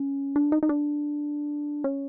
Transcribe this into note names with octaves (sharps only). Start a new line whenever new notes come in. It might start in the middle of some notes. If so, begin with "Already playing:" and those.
Already playing: C#4
D4
D#4
D#4
D4
C#4